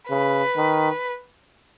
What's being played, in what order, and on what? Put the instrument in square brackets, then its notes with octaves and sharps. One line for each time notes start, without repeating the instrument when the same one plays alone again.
[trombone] C#3 [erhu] B4
[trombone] D#3